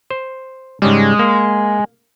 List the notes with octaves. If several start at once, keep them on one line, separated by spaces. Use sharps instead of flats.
C5
G#2 C#3 G3 G#3
A#3